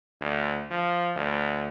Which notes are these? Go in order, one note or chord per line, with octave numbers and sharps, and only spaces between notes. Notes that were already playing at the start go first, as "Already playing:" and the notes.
D2
F3
D2